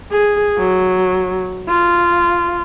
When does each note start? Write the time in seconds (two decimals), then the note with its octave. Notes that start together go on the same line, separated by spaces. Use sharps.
0.12 G#4
0.59 F#3
1.69 F4